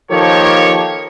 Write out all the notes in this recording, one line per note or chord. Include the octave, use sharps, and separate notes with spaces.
D#3 F3 A#3 G4 A4 C#5